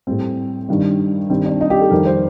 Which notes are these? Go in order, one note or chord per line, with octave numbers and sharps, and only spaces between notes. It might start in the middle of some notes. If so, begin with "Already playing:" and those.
A2 G3 C4
G2 D#3 G3
G2 D#3 G3 C4
D4
D#4
G4
A4
F2 D#3 G3 A#4
C5